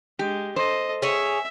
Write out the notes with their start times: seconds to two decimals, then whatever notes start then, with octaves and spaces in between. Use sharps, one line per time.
0.19 G#3 G4
0.56 A4 C5 D#5
1.02 C#4 G#4 E5